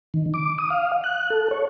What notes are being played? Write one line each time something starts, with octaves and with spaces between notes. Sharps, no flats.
D#3
D6
D#6
F5
F#6
A4
C#5